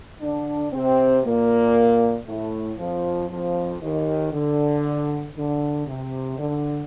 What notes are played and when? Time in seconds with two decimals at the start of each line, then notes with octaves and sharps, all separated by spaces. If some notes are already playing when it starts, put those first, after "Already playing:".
0.21 D3 D4
0.73 C3 C4
1.25 A#2 A#3
2.27 A2 A3
2.79 F2 F3
3.30 F2 F3
3.81 D#2 D#3
4.33 D3
5.37 D3
5.87 C3
6.38 D3